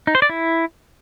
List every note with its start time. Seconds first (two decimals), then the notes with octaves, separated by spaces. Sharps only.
0.07 D#4
0.15 C5
0.22 D5
0.29 E4